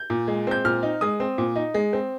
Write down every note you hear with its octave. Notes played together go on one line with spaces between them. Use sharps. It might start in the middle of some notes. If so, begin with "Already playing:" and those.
Already playing: G6
A#2
G#3
C4 G6
A#2 F6
D#4
G#3 D#6
C4
A#2
D#4
G#3
C4